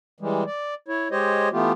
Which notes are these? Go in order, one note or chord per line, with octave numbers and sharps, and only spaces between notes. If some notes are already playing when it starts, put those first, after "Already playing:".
E3 G3 G#3
D5
E4 C#5
G#3 G4 C5 C#5 D#5
E3 A3 B3 F4 G4